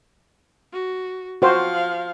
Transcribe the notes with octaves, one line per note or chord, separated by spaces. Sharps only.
F#4
F3 F#4 C5 F5